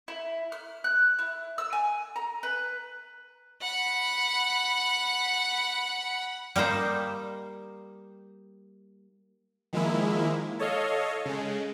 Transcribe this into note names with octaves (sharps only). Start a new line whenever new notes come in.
E4
F6
F#6
E4
E6
G#5
A#5
B4
F#5 B5
G3 A#3 D#4 C5
D#3 F3 G#3 A#3 E4
A4 C#5 D#5 F5
C#3 G#3